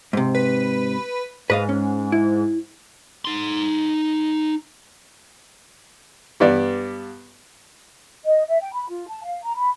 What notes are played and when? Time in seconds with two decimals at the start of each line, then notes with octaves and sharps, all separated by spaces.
0.13 G#2 C3
0.35 B4
1.50 G#2 B4 D#5 F5
1.69 C#4
2.12 E4
3.25 D#4 C6
6.40 G2 B3 D5
8.25 D#5
8.48 E5
8.60 G5
8.72 B5
8.88 F4
9.08 A5
9.24 F5
9.42 A#5
9.56 B5